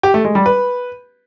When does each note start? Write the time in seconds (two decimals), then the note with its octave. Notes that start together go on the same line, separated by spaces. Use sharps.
0.03 G4
0.14 A3
0.25 G#3
0.35 G3
0.46 B4